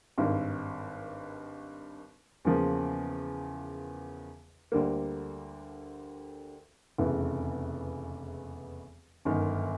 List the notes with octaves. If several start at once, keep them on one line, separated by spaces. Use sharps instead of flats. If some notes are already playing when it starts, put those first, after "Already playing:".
G#1 G2 D#3
E2 C#3 F3 A#3
D2 D3 G3 A#3
F1 E2 C#3 E3
G1 F#2 D#3